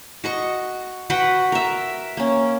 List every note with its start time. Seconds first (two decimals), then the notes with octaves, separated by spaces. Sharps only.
0.24 F#4 D#5 C#6
1.10 F#4 B4 F#5 G5
1.52 A#4 E5
2.17 A#3 C#4